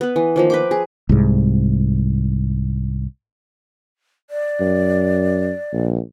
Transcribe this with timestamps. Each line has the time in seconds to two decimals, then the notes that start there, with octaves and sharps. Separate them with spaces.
0.01 B3 B4
0.16 E3
0.36 D#3 F3 A#3
0.50 B4 G5 D6
0.71 G#4
1.09 C2 G#2
4.30 D5
4.61 F#2
5.73 A#1